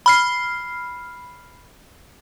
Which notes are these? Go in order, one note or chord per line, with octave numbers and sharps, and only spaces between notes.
B5 F6 C7